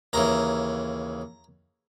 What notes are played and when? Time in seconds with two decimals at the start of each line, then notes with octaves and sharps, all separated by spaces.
0.13 D#2 C#3 E3 A#5